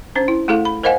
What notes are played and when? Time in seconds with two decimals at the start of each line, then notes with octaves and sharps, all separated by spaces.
0.15 C#4 D4 C5
0.28 E4
0.48 A3 E4 G#4 A4 F5
0.65 B5
0.83 A#4 C5 D#5 F5 F#5 G#5